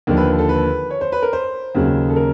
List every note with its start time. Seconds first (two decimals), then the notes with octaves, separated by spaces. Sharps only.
0.07 D#2 D3 F3
0.17 B4
0.39 A4
0.49 B4
0.90 C#5
1.01 C5
1.12 B4
1.22 A#4
1.33 C5
1.75 D#2 C#3 F#3
2.10 A4
2.16 A#4